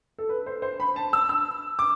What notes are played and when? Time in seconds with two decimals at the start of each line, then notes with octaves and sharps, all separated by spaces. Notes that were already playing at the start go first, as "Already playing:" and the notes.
0.18 A4
0.29 B4
0.46 C5
0.62 C5
0.80 B5
0.96 A5
1.13 E6
1.29 E6
1.79 D6